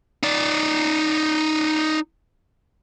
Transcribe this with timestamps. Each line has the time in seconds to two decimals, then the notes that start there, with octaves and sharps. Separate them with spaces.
0.23 D#4 D5